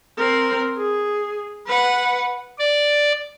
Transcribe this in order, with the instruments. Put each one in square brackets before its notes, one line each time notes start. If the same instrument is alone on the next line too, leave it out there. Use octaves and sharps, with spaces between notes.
[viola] C4 A#4
G#4
B4 F#5
[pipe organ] D5